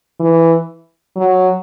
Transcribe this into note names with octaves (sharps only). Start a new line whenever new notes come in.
E3
F#3